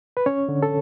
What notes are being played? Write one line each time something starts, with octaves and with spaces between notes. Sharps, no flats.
B4
C#4 C#5
D3
A4